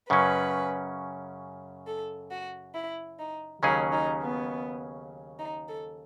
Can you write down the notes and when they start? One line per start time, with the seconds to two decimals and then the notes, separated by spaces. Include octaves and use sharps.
0.10 F#2 C#3 F#3 C#4 B4
1.87 A4
2.31 F#4
2.74 E4
3.19 D#4
3.63 D#2 C#3 F#3 C#4 D#4 G#4
3.92 D#4
4.22 B3
5.39 D#4
5.69 A4